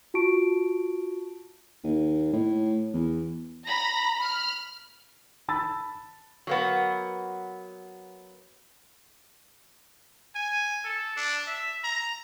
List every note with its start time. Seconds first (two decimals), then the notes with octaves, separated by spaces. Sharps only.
0.14 F4 F#4 A5 C#6 D7
1.84 D#2
2.33 A2
2.93 E2
3.66 A#5 B5 A#6
4.18 B5 F6
5.49 A5 B5 E6 A6
6.47 F#3 A#3 B3
10.35 G#5
10.85 A4
11.17 D4
11.47 E5
11.84 A#5